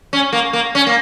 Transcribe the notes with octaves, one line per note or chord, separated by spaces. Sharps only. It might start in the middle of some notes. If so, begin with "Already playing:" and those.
C#4
A#3
A#3
C#4
A#3